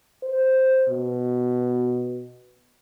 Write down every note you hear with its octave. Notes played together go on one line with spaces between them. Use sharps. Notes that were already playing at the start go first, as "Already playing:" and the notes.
C5
B2